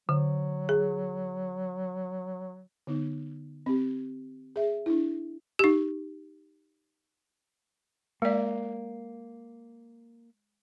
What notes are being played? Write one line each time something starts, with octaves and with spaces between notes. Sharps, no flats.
D3 F#3
G#4
D3 B3 D#4
C4 G4
G#4 E5
D4 E4
D#4 G4
G#3 A#3 D5